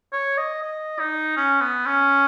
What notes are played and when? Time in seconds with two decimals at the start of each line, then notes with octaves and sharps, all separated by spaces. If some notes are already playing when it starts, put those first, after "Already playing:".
0.13 C#5
0.38 D#5
0.62 D#5
0.99 D#4
1.37 C#4
1.61 B3
1.86 C#4